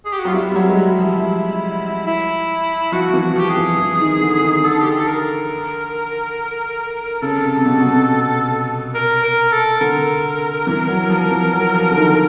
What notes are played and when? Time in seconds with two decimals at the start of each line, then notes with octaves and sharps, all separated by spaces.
0.05 G#4
0.12 G4
0.19 F#4
0.25 F#3 F4
0.34 G3 E4
0.51 G3
0.56 F#3
0.69 G#3
0.77 G3
0.99 F3
2.06 E4
2.92 F3 F#4
3.14 E3
3.21 F#4
3.36 F3 G4
3.50 G#4
3.57 E3
3.78 E3
4.00 D#3
4.22 D3
4.43 D#3
4.64 D3 A4
4.81 G4
4.90 G#4
4.99 A4
5.07 A#4
7.22 C#3 A4
7.44 C3
7.57 C3
7.66 B2
7.80 B2
7.87 C3
8.94 A#4
9.23 A#4
9.52 A4
9.80 D3 A#4
10.67 E3
10.88 F#3
11.10 F3
11.31 E3
11.53 F#3
11.74 F3
11.91 D3
11.96 D#3